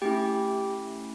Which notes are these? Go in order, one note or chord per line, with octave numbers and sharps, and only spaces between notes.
A3 C#4 E4 G4 G5